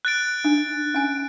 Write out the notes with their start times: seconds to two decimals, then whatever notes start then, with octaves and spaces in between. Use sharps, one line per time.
0.05 F#6 A6 D7
0.44 D4
0.94 C#4 G#5